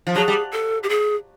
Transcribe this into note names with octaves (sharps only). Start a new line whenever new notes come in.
F3
F#3 G#4
G3
A4
G4
G#4